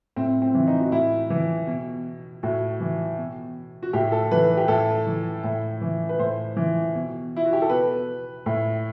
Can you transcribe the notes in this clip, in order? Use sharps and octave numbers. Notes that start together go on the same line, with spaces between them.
A2 C4
C4
E3
D#4
F#4
A2 E4
E3
B2
A2 F#4
E3
B2
F#4
A2 G4
A4
E3 B4
G4
A2 A4
E3
A2
E3
B4
A2 C5
E3
B2
E4
F#4
G4
A4
B2 B4
A2